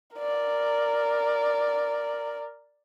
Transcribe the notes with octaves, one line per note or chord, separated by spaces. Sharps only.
A#4 D5